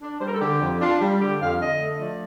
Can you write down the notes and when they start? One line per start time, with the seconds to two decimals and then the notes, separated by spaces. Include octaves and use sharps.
0.01 D4
0.20 G3 C5
0.27 A#4
0.34 A4
0.41 D3 G4
0.60 F2
0.80 D4 F4
1.01 G3
1.20 D3 G4
1.41 F2 F5
1.60 D3 D#5
1.80 A3
2.00 F3 D5